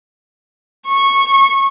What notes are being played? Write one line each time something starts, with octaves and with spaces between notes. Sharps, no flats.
C#6